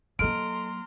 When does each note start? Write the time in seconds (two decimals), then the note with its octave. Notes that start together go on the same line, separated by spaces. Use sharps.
0.19 F#3 A#3 A4 D#5 A#5 C6 F6 D7